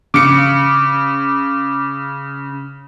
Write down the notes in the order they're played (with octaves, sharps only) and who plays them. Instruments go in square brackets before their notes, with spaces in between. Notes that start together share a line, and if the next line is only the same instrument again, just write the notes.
[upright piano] C#3 C#7 [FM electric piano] D6